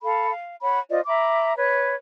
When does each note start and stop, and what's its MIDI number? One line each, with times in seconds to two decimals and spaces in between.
0.03 0.30 69
0.03 0.30 77
0.03 0.30 83
0.31 0.55 77
0.62 0.79 73
0.62 0.79 78
0.62 0.79 83
0.89 1.01 65
0.89 1.01 72
0.89 1.01 74
0.89 1.01 75
1.06 1.53 76
1.06 1.53 82
1.06 1.53 83
1.06 1.53 86
1.56 1.94 71
1.56 1.94 73